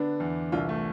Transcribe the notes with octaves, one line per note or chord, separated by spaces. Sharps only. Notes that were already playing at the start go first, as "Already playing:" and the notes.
Already playing: D3 B3 D4
E2
C2 D4 F4
A3